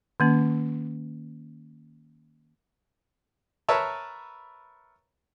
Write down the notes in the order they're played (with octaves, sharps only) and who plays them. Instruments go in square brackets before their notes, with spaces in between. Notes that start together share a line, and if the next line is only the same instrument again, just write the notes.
[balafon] D#3 A#3 C#4
[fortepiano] A#4 B4 C#5 E5 A5